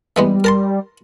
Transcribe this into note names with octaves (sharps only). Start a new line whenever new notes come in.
E3 G3 G#3 B3
A#4 A5 C6